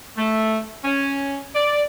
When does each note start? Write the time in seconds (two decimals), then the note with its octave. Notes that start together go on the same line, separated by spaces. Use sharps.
0.17 A3
0.84 C#4
1.53 D5